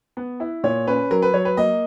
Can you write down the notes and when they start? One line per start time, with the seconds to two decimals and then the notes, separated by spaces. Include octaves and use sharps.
0.17 B3
0.40 E4
0.64 A#2 C#5
0.87 C#4 B4
1.11 F#3 A#4
1.22 B4
1.34 F#3 C#5
1.45 B4
1.57 A#3 D#5